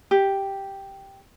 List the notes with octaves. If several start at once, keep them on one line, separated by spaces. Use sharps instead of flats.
G4